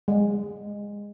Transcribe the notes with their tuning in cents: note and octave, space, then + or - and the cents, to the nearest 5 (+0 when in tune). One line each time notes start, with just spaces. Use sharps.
G#3 -20